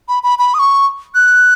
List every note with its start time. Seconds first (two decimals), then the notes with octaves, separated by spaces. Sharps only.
0.08 B5
0.23 B5
0.39 B5
0.54 D#6
0.59 C#6
1.14 F#6